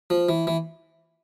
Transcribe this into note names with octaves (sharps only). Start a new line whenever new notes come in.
F3
E3
E3